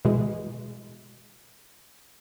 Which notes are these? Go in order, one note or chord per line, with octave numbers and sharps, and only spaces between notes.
B2 E3 G#3